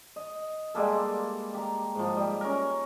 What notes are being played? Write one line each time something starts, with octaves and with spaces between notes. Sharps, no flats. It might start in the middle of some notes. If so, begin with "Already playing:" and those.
D#5
G3 G#3 A#3 A4
G4 A#5
G#2 F3
G3
C#4 A#4